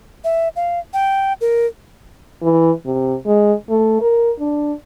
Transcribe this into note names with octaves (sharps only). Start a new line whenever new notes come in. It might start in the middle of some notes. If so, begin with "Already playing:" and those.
E5
F5
G5
A#4
E3
C3
G#3
A3
A#4
D4